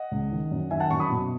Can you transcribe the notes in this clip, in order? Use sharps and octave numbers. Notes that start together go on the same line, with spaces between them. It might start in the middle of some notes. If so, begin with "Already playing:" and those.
Already playing: D#5 F#5
C#2
D#3
F#2
D#3 E5 G#5
F#5 A5
F#2 A5 C#6
B5 D#6
B2